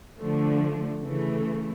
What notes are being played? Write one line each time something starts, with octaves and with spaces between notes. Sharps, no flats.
D3 F3 A3
C#3 E3 A3